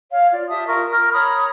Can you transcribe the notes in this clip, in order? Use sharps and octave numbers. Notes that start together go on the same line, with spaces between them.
C#5 F5
F4 D5
G4 E5 A5 D#6
F4 A#4 C#6
A#4 F6
C#5 A#5 B5 D#6